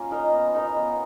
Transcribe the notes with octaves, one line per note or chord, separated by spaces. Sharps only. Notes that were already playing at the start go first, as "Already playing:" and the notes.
Already playing: A#3 C#4 F4
D#4 A#4 D#5
B3
D#4 A#4 D#5
B3